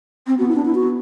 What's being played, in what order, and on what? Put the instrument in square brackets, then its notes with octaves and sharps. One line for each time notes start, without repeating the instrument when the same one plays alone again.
[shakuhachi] C4
[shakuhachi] B3 [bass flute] F#4
[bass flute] E4
D4
E4
F#4